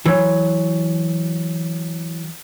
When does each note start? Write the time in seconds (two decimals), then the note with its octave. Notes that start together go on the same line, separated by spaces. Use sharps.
0.06 E3 F#3